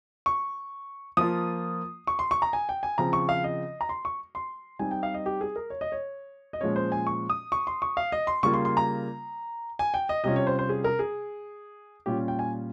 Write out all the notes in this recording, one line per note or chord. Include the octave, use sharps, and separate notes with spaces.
C#6
F3 A#3 F4 D#6
C#6
C6
C#6
A#5
G#5
G5
G#5
C#3 F3 C4 A#5
C#6
F5
D#5
A#5
C6
C#6
C6
G3 C4 D#4 G#5
G5
F5
D#5
G4
G#4
A#4
C#5
D#5
C#5
D#5
A#2 F3 G#3 C#4 C#5
C5
G#5
C#6
D#6
C#6
C6
C#6
F5
D#5
C6
C#3 G3 A#3 F4 C#6
C6
C6
A#5
G#5
G5
D#5
C3 G3 C#4 F4 D#5
C#5
C5
C5
G#4
A#4
G#4
A#2 G3 C#4 F4 G4
G5
G#5